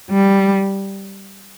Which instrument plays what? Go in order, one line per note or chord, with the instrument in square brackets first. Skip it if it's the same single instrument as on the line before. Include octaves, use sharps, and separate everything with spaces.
[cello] G3